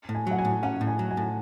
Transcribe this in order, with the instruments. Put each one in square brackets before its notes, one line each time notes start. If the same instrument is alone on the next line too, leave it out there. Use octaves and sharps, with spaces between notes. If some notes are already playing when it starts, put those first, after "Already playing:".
[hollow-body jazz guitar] A2
[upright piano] G#5
[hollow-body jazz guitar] F#3 [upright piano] F#5
[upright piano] G#5
[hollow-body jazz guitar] A2
[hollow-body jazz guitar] C#4 [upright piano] F#5
[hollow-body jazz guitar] A2
[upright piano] G#5
[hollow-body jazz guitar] F#3
[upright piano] G#5
[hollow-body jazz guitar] A2